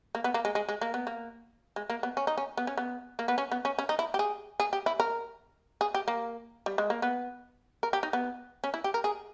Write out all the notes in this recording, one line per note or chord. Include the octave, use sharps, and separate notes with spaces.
A#3
B3
A#3
G#3
G#3
G#3
A#3
B3
A#3
G#3
A#3
B3
C#4
D#4
C#4
B3
C#4
B3
A#3
B3
C#4
B3
C#4
C#4
D#4
E4
G4
G#4
G#4
G4
E4
A#4
G#4
G4
A#3
G3
G#3
A#3
B3
A#4
G4
D#4
B3
C#4
E4
G4
A#4
G#4